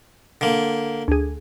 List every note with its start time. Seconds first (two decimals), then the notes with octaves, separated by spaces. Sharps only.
0.41 D3 A#3
1.08 D2 G#4